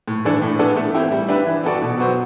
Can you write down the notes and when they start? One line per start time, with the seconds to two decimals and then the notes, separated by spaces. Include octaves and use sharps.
0.08 A2
0.25 E3 A3 D4 A4
0.42 A2
0.59 E3 B3 D4 A4
0.76 A3
0.94 C4 E4 G4
1.12 G3
1.29 D4 G4 B4 E5
1.46 E3
1.64 B3 F#4 A4 D5
1.82 B2
1.98 F#3 B3 F#4 C5